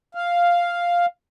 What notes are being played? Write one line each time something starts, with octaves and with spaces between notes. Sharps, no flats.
F5